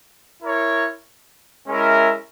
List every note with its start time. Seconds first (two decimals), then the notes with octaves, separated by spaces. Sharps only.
0.42 E4 A#4 C#5
1.67 G#3 C#4 E4 A#4 E5